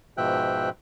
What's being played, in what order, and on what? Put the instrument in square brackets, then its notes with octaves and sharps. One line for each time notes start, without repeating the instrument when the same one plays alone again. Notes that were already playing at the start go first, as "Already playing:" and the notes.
[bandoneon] G#2 B2 F3 E5 G5 F#6